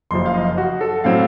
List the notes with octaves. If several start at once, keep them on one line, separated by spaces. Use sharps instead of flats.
F#1 F#2 F3 C6
F5
D#5
F#4
A4
A2 F#3 C4 F5